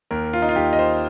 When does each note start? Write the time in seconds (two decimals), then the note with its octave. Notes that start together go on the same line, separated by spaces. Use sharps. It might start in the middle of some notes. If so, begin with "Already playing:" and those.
0.11 D#2 A#4
0.33 F4
0.42 D#4
0.49 F4
0.56 D#2 G4
0.73 D#5
0.79 C5